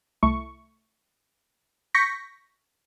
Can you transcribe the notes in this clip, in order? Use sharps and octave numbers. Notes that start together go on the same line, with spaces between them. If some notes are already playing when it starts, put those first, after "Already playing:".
C2 A3 E4 C#6
C#6 G6 A#6 B6 C#7